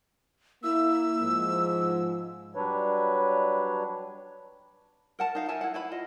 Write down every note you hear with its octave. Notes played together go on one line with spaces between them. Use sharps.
A#3 E4 E6
G#2 F3
F#3 G3 D4 B4 C#5
A#4 F#5 A5
D#4 F5
A#4 E5 G#5 A5
E4 F#5
E4 B4 B5
F4 D#5